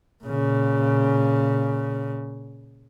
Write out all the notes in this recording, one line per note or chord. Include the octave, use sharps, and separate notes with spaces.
A#2 C#3